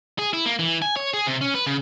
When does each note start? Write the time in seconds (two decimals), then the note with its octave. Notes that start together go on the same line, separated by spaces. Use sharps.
0.19 G#4
0.33 E4
0.46 A#3
0.59 E3
0.82 G#5
0.96 C#5
1.14 G#4
1.27 C3
1.41 C#4
1.54 B4
1.67 C#3